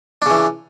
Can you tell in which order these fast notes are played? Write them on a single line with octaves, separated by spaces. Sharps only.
D4 C#3 E3